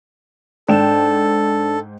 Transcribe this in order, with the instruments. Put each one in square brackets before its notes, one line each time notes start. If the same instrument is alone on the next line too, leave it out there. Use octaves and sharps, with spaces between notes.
[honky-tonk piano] G#2 G5 E7 [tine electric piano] D4 [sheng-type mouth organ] A4